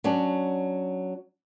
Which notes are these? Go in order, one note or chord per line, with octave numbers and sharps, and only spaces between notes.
F#3 C#4 D4